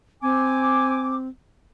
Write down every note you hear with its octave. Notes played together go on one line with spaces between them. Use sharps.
C4 G#5 D6